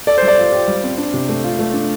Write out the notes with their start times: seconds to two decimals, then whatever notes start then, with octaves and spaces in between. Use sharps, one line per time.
0.07 A4 D5
0.18 G3 C5
0.28 D5
0.38 F4
0.52 G4
0.68 G3
0.84 C4
0.98 D4
1.14 C3
1.29 A3
1.44 F4
1.59 A3
1.74 D4